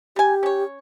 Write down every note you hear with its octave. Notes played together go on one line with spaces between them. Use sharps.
G3 G4 G#5
C#4 C#5